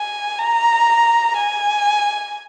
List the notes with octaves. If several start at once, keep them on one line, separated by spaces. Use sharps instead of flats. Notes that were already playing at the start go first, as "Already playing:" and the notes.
Already playing: G#5
A#5
G#5